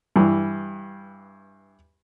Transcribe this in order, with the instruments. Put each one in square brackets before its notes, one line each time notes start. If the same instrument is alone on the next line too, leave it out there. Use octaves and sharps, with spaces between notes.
[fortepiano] G2 E3